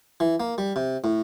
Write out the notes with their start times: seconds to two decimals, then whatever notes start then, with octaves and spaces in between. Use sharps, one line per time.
0.20 E3
0.40 A#3
0.58 G3
0.76 C3
1.04 A2